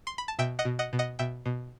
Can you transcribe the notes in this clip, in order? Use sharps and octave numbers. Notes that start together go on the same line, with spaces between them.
C6
B5
A5
B2 E5 G5
D#5 F#5
B2
D#5 F#5
B2
D#5 F#5
B2 E5 G5
B2